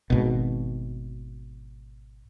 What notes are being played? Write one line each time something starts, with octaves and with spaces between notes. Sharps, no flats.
G#1 B2